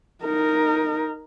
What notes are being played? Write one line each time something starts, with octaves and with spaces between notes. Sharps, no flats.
D#4 A#4